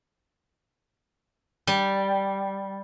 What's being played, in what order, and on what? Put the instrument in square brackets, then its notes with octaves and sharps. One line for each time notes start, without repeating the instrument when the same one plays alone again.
[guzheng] G3